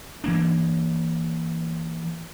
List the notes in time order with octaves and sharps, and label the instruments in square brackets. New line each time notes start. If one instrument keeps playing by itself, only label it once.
[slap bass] E3 A#3 D4